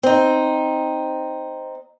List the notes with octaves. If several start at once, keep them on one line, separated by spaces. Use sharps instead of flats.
C4 D#4